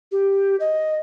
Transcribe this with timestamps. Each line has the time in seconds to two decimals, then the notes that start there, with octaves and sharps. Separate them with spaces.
0.12 G4
0.60 D#5